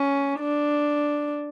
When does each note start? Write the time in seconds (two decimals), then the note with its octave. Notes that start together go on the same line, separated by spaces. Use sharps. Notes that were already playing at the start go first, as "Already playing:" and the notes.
Already playing: C#4
0.40 D4